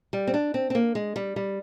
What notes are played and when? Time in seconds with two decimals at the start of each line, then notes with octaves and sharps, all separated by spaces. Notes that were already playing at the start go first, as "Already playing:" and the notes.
0.13 G3
0.27 C4
0.34 D4
0.54 C4
0.70 C4
0.75 A#3
0.95 G#3
1.16 G3
1.36 G3